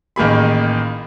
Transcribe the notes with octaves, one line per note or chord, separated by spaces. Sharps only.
A1 D#3 A#3 G#4 B5